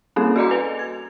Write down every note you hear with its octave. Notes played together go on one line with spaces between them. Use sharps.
G3 A#3 C4 C#4 E4 G#4
F#4 A4 D5 D#5 A#5 D6
B4 F7
G#6